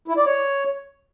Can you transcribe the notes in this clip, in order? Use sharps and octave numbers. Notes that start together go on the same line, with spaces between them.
E4
D5
C#5